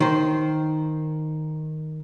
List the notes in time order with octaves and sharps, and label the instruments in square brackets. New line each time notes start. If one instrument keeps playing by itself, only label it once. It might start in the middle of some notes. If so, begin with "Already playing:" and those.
[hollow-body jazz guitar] D#3 C5